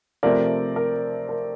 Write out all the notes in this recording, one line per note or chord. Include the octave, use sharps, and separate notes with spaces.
C3 F3 A3 C4 A#4 D5
A#4
A#4